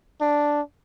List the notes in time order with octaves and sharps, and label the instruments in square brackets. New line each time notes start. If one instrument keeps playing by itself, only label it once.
[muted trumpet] D4